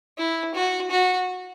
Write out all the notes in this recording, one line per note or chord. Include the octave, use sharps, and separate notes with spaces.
E4
F#4
F#4